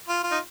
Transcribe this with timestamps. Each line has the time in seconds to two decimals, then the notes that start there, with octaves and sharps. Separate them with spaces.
0.09 F4
0.23 F4
0.31 D#4